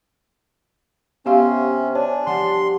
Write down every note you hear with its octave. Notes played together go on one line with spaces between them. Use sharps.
C3 B3 C#4 G4 C5 E5 F5 C6
D4 C#5 G#5
F3 G3 F#5 C6